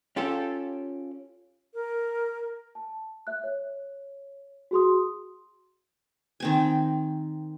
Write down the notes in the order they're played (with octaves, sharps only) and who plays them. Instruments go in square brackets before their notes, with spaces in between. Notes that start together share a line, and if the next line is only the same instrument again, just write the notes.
[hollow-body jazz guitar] C#4 F4 G4 A4
[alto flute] A#4
[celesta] A5
E5 F#6
C#5
F#4 G#4 C6 D#6
[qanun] D#3 C4 G#5